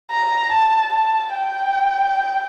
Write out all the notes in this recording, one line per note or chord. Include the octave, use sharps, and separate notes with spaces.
A#5
A5
A5
G5